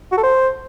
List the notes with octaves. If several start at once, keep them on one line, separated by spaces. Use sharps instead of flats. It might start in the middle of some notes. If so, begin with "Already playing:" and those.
F#4
A4
C5